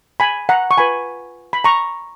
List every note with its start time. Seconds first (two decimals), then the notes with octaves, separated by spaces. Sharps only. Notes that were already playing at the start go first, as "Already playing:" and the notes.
0.20 G#5 B5
0.49 F#5 A#5
0.71 C#6
0.78 F4 B4 G#5 B5
1.53 B5
1.64 A#5 C#6